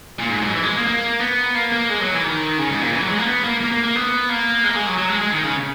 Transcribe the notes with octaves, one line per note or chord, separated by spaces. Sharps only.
A#2
G#2
G#2
F#3
E3
G#3
A#3
A#3
B3
A#3
A#3
G#3
F#3
E3
D#3
C#3
G#2
A#2
E3
F#3
G#3
A#3
B3
A#3
A#3
A#3
A#3
B3
A#3
G#3
A#3
G#3
F#3
F#3
G#3
G#3
D#3
C#3